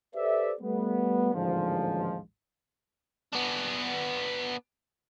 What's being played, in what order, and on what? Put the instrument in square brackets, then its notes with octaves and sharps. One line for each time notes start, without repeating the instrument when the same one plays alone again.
[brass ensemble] G4 A4 B4 C5 D5 E5
G3 A3 B3
A1 D#2 G#2 D3 F3
[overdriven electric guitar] B3 D4